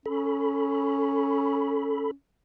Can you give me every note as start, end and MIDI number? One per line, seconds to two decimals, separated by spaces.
0.06 2.12 61
0.06 2.11 69
0.06 2.11 83